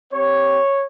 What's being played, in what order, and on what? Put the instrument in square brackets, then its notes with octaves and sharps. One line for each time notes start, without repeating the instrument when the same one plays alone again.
[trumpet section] C4 G4 C#5